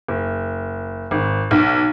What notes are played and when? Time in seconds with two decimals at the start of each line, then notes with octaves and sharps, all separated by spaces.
0.09 F#1
1.11 G#1
1.51 B1